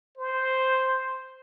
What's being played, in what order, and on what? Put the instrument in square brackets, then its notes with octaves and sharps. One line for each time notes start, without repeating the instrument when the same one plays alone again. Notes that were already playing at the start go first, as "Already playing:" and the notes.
[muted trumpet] C5